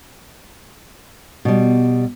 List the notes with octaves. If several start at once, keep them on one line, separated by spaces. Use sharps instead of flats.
B2 G3